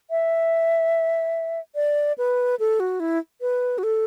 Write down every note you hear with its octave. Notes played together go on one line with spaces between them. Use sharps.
E5
D5
B4
A4
F#4
E4
B4
F#4
A4